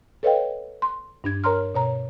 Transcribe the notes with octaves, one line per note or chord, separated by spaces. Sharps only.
A4 B4 C#5 D#5 F5 G5
C6
G2 D4 G#6
A#4 C#5 A#5 C6 F6
B2 C#5 A#5